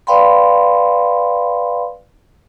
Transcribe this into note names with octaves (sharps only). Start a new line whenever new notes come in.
B4 D5 F5 G5 B5 C6